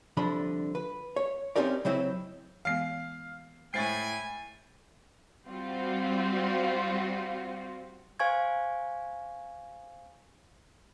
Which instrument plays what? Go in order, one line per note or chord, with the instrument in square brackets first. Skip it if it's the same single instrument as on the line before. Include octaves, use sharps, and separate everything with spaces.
[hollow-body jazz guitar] C2 D3 F3 B5
B4
C#5
C4 C#4 D#4 G4 A#4 D5
C#3 F#3 C4 E4 D#5
[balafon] E3 G#3 B3 [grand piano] F5 C7
[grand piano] A2 A6 C7 [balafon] G#3 C5 [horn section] E4 G5 G#5
[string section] G3 C4 F4 F#4
[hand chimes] C5 F5 G#5 C#6 G#6